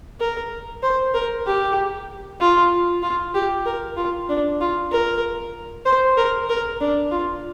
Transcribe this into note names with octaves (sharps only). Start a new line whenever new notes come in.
A#4
C5
A#4
G4
F4
F4
G4
A#4
F4
D4
F4
A#4
C5
A#4
A#4
D4
F4